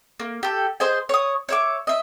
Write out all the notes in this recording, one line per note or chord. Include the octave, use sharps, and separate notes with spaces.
A#3
G4 A4
G#4 C5 D#5 G#5
C#5 D#6
C#5 E5 D6
D#5 E5